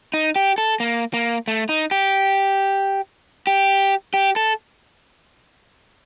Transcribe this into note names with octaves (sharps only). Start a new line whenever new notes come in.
D#4
G4
A4
A#3
A#3
A3
D#4
G4
G4
G4
A4